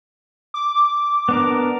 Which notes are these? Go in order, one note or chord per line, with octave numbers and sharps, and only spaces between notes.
D6
B3 D4 A#4